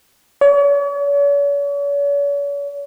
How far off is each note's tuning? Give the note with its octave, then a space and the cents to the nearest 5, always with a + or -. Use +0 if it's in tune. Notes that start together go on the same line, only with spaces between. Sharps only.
C#5 +45